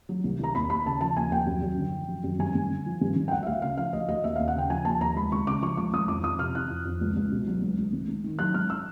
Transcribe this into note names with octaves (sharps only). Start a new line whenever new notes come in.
F#3
C2
C2 A#5
D#2 B5
D#2 B5
C#3 A5
F3 A5
D#2 G#5
D#2 G5
F#2
F#2
D3
F3
F#2
F#2
G2 G#5
G2
D3
F3
G2
G2
G5
D2 F#5
E5
D2 F5
C#3 F5
F3 F5
D2 D#5
D2 D#5
D#2 E5
D#2 F5
F#5
C#3 G5
F3 G#5
D#2 A5
D#2 A#5
C#2 B5
C#2 C#6
C#3 D6
F3 C#6
C#2 D6
C#2 D#6
F2 D6
F2 D#6
C3 F6
E3 F#6
F2
F2
C#2
C#2
B2
F#3
C#2
C#2
G#2
G#2
D#3
F#3 F#6
G#2 F6
E6